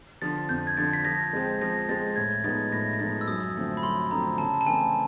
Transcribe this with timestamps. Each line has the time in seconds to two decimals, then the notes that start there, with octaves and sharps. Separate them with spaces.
0.22 D3 F3 A6
0.49 F2 G6
0.67 G#6
0.77 D3 F3 A6
0.93 B6
1.05 F3 A#6
1.33 G#3 C4
1.61 F3 A#6
1.89 G#3 C4 A6
2.16 A2 G#6
2.44 F3 G#3 B3 D#4 A6
2.72 A2 A#6
2.93 A#6
3.00 F3 G#3 B3 D#4 A6
3.21 E6
3.27 F#2 D#6
3.56 D3 F3 A3 C4
3.77 B5
3.83 F#2 C6
4.11 D3 F3 A3 C4 A#5
4.38 C#3 A5
4.61 A5
4.66 E3 A3 C4 G#5